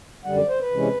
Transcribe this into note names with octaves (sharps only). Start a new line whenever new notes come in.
F#2 D3 G3 F#5
D5
C5
B4
C3 E3 G#3 C#4